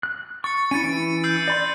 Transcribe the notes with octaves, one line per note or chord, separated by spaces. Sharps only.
F#6
C#6 A6 C#7
C#4 E4 A6 C#7 D#7
E3 C#4 E4 D7
E6 G6 C7
D5 B5 C6